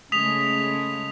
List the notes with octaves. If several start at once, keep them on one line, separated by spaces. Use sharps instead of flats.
C#3 G#3 A3 D#6 B6 F7